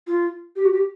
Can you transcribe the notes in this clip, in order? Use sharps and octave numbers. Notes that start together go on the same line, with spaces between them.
F4
G4
F#4
G4